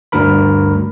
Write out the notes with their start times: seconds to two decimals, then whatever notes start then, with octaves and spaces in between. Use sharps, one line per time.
0.12 D2 G2 A#4 B5